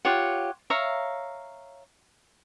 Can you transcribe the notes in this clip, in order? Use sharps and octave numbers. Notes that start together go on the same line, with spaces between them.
F4 G4 C#5 F#5
C#5 E5 F5 A#5